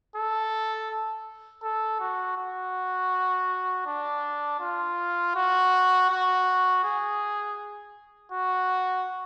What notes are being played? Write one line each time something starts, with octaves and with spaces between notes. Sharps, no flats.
A4
A4
F#4
F#4
D4
F4
F#4
F#4
G#4
F#4